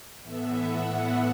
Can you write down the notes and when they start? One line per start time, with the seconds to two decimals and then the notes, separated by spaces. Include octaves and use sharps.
0.22 A2 E3 B3 E5
0.57 F#5
0.91 E5